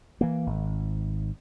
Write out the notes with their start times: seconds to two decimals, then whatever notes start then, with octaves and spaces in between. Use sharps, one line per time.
0.21 E3 A#3
0.47 G#1